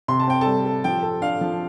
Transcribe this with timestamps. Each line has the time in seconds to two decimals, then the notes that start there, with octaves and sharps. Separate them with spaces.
0.08 C3 C6
0.19 A5
0.28 C4 G5
0.41 G3 A4 A5
0.65 A4
0.84 F3 G5
1.03 A4
1.22 D4 F5
1.41 F3